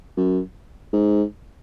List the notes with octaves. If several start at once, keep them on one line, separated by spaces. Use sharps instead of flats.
F#2
G#2